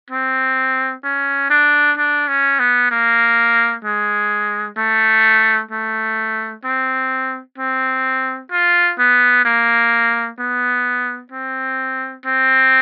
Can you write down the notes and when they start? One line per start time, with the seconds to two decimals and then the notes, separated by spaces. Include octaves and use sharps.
0.10 C4
1.04 C#4
1.50 D4
1.97 D4
2.28 C#4
2.59 B3
2.91 A#3
3.84 G#3
4.77 A3
5.71 A3
6.65 C4
7.58 C4
8.51 F4
8.99 B3
9.45 A#3
10.39 B3
11.32 C4
12.26 C4